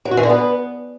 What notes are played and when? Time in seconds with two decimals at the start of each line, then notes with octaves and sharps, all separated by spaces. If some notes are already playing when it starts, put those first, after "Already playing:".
0.05 F#3
0.11 F#4
0.17 E3
0.23 D3
0.29 B3